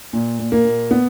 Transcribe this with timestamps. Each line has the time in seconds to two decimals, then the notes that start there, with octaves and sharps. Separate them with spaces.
0.13 A#2
0.39 A#2
0.52 A#3
0.65 A#2
0.91 B3